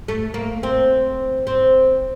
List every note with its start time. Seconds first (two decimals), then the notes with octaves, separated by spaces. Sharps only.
0.08 A3
0.34 A#3
0.63 C4
1.47 C4